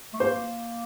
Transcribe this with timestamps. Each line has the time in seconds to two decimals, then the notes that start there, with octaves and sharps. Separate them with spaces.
0.13 A3
0.20 A#3 C5